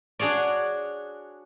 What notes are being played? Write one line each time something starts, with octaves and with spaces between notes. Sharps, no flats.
D4 F#4 G#4 C#5 D5